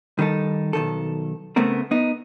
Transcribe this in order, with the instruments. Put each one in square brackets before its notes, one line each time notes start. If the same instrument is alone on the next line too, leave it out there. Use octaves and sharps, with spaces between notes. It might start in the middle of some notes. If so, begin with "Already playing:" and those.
[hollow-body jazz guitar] D#3 G3 D#4 A4
B1 D#3 A4
C#3 A3 B3 C4 A#4
B3 D#4